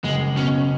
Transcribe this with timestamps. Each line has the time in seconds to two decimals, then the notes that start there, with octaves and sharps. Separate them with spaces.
0.03 F#1 G#3
0.36 B2 C#4